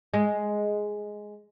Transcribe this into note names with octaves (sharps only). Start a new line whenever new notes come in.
G#3